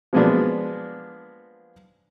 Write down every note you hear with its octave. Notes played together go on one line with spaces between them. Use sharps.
F3 F#3 G#3 A#3 B3 D4